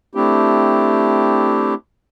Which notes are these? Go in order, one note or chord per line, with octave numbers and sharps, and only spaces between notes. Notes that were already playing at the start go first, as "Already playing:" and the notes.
A3 C4 D4 E4 G4